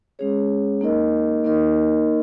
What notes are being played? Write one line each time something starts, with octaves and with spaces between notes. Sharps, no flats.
G#3 C#4 G#4 C#5
A#3 D#4 A#4 D#5
A#3 D#4 A#4 D#5